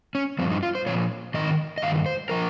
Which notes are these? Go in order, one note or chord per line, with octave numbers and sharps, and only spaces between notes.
C#4
G2 F3 C4
D#4
F4
C5
A#2 F3 C#5
G#2 D#3 D#5
D#5
G2 D#3 F5
C5
F3 A#4